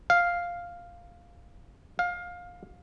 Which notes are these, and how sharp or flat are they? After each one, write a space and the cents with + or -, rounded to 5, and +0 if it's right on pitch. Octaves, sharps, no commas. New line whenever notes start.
F5 +0
F5 +20